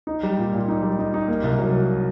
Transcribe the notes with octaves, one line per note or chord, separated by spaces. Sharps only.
D#4
G3
A#2
A#2
D#4
G3
D#4
D#4
A#3
C2
F#3